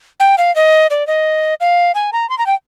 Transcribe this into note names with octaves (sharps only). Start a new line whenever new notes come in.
G5
F5
D#5
D5
D#5
F5
G#5
A#5
C6
A#5
G5